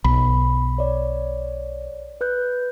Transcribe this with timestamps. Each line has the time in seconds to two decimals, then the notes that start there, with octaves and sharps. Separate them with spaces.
0.04 B1 B5
0.78 C#5 D5
2.21 B4 F#6 G6